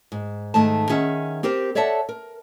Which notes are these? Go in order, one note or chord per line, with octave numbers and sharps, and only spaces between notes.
G#2
G#2 D#3 A3 D#4 A5
D#3 C#4 G#4 E5 F#5
C4 G4 A#4 C5
A4 C#5 D5 E5 F#5 A5
A#4